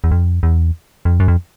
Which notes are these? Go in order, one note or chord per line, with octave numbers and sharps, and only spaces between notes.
E2
F2
E2
F2
F#2
F2